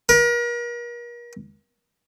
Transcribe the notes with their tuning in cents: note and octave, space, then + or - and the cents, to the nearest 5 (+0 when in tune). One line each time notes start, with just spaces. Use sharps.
A#4 +40